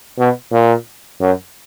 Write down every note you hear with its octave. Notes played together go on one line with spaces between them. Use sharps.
B2
A#2
F#2